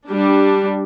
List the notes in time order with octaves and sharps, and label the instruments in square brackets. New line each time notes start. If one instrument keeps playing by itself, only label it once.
[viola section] G3 D4